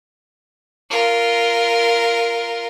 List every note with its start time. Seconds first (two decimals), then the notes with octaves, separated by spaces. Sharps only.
0.90 F4 A#4